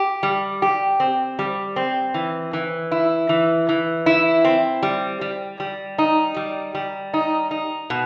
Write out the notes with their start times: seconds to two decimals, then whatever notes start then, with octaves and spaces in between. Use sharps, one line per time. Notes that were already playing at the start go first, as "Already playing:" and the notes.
Already playing: G4
0.23 G3
0.62 G4
1.00 C4
1.39 G3
1.76 C4
2.14 E3
2.53 E3
2.91 E4
3.29 E3
3.69 E3
4.06 E4
4.44 C4
4.83 G3
5.21 G3
5.60 G3
5.98 D#4
6.36 G3
6.75 G3
7.14 D#4
7.51 D#4
7.90 B2